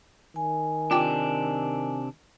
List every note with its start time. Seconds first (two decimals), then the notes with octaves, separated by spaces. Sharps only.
0.36 D#3 G#5
0.91 C3 D4 F4 G5 D6